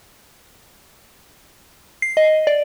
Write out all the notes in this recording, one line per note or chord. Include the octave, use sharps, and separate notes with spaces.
C7
D#5
D5